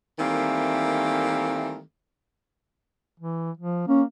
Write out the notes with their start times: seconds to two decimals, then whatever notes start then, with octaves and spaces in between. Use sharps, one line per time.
0.19 D#3 E3 G3 A3 A#3 C4
3.20 E3
3.57 F3
3.88 A#3 C#4